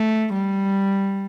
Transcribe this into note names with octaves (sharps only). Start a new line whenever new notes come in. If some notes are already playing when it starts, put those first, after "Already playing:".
Already playing: A3
G3